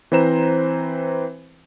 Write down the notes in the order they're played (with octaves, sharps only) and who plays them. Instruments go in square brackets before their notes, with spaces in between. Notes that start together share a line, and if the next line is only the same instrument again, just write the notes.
[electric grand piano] E3 C4 B4 C5 A#5 E7